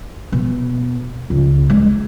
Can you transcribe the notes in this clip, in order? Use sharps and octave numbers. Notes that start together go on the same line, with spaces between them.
B2
C#2
G#3